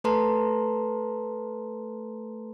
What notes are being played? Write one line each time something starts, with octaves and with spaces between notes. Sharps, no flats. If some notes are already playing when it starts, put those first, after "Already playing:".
A3 A4 B4 A5 A#5 C6